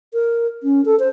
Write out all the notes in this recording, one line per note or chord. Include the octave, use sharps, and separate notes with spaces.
A#4
C#4
A4
C5